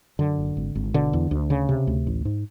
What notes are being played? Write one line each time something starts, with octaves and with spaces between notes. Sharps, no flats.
F#2 D3
F#1
G#1
G#1
B2 D3
E2
D2
C#3
C3
D2
A1
G#2